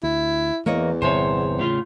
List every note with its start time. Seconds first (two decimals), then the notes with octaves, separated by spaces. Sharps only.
0.03 D2 E4
0.66 E2 E3 A#3 C#5 D#5
1.02 G1 C3 C5 C#5 G#5
1.59 A2 C#3 F4